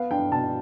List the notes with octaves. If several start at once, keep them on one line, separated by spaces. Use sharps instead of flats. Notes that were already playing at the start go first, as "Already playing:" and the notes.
Already playing: B3 F5
D4 G5
B2 A5